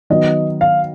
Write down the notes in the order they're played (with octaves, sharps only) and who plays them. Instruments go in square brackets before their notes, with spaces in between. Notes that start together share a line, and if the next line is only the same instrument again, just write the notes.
[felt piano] D#3 F#3 B3 [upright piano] D#5
[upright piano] F5